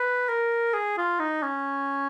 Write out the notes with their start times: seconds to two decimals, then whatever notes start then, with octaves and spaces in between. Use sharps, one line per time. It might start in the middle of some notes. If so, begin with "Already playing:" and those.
Already playing: B4
0.29 A#4
0.74 G#4
0.98 F4
1.19 D#4
1.43 C#4